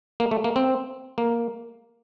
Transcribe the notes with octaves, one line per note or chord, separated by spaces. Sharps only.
A#3
A3
A#3
C4
A#3